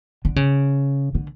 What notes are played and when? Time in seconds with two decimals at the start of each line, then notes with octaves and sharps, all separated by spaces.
0.25 D3
0.36 C#3
1.15 D3